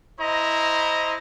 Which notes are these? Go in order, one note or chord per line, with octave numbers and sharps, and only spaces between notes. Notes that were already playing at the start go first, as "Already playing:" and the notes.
E4 C5 D#5 A#5